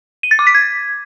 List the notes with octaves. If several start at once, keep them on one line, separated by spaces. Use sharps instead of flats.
D#7
A6
D6
B6
G#6